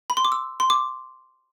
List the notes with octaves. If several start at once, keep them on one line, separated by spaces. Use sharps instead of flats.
B5
C6
D6
E6
C6
D6